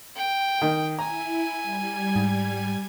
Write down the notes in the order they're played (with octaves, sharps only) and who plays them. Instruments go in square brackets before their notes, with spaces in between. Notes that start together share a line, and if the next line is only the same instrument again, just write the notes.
[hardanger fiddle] G5
[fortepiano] D#3
[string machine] E4 [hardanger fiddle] G#5 [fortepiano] A#5
[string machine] G3 G#6
[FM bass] G#2